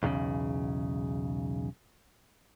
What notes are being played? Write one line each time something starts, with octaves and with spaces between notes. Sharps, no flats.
B1 E2 A#2 C#3